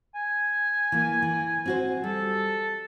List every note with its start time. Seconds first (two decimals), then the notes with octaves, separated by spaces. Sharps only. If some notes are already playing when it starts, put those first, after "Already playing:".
0.15 G#5
0.92 E3 A#3
1.22 E3
1.66 C4 F#4 C5
2.04 G3 A4